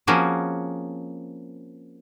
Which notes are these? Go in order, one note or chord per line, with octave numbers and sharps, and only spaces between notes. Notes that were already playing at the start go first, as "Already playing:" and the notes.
F3 A#3 C4 C#4 F#4 G#4